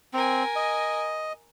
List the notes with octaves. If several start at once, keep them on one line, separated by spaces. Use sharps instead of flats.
C4 A#4 G#5
D#5